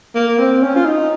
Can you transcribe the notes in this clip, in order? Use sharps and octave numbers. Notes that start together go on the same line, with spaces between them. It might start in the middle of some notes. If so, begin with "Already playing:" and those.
A#3
C4
C#4
F4
D#4